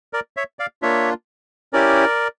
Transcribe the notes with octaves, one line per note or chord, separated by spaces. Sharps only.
A#4 D5
C#5 E5
D5 F5
A#3 D4 F4 C#5 E5
C#4 E4 G4 A#4 D5